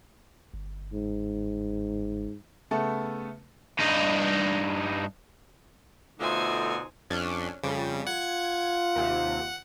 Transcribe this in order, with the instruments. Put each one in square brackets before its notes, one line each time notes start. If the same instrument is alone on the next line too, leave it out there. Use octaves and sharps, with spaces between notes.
[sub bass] G1
[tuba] G#2
[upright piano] C#3 A3 B3 A4
[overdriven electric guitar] G2 D#4
[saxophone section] B2 D3 F4 [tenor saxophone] A3 [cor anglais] D#4 [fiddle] C5 G#5
[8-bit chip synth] F2 [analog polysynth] C#4 D4
[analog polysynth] F2 G3 [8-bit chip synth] C#3
[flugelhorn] F4 [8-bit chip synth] F#5 [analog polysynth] G#6
[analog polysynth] D#2 C3